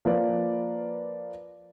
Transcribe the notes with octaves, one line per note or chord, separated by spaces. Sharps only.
F3 A#3 F4 B4 D5